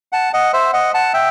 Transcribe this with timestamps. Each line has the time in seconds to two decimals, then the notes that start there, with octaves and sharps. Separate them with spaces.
0.12 F#5 A5
0.33 D#5 F#5
0.53 C5 E5
0.73 D#5 F#5
0.94 F#5 A5
1.13 E5 G5